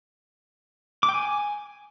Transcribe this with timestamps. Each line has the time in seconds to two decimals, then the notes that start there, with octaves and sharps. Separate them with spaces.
1.03 D6
1.09 G5
1.14 G#5